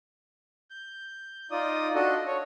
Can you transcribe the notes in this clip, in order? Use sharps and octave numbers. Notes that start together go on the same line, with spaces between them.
G6
D#4 F4 D5 D#6
D4 F#4 A4 D#5
C#5